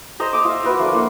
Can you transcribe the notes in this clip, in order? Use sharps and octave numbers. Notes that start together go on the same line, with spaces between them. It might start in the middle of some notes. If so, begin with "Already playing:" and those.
C5 D#5 A#5
D6 D#6
F4 E5
F#4 A#4 B4 E5
F3 A3 D4 A#4
A#3 F4 F#5